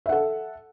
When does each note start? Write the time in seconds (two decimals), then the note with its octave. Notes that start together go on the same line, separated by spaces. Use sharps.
0.06 E5
0.09 F#5
0.12 A4